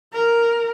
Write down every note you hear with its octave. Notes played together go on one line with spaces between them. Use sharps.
A#4